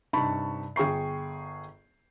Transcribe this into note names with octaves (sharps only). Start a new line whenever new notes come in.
G2 C3 D#4 A5 B5 C#6
G1 G#4 G5 C#6 C7